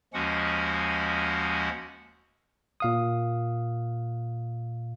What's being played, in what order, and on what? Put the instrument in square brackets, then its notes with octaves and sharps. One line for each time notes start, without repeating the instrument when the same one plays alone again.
[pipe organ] D#2 F3 G#3 C#4 F#4 F#5
[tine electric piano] A#2 F5 D#6